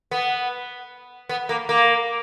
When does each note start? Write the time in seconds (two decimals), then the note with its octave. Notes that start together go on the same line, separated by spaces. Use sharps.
0.11 B3
1.29 B3
1.49 A#3
1.69 A#3